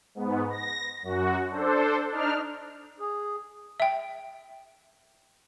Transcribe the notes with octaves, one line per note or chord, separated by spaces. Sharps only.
G#2 B3
A#6
F#2 F#4
D4 A4 C5
D4 D#4 F6
G#4
E5 G5